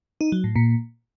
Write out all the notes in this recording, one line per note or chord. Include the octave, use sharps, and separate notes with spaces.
D#4
F#3
A2
A#2